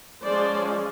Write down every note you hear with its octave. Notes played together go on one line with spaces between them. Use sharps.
F3 G#3 C#4 C5 D5